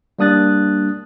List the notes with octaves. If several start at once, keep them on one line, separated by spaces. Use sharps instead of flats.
G3 A#3 D4 D#6 F#6 A6